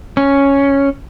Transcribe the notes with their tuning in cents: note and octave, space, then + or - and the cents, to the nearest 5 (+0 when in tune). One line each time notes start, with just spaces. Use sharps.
C#4 +0